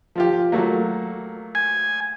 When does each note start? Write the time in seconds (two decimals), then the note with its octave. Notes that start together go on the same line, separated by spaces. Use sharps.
0.16 F3 F4 G4
0.52 F#3 A3 A#3
1.55 G#5